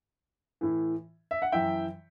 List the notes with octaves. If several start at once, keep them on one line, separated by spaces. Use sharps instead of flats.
A2 E3
E5
F#5
F#2 E3 E5 G5